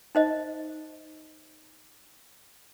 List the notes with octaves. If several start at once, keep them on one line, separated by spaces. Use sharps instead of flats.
D#4 C5 D#5